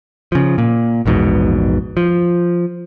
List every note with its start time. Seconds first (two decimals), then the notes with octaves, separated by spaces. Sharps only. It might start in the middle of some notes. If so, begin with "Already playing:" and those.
0.32 C#3 F3
0.58 A#2
1.06 A#1 E2 G#2 B2
1.97 F3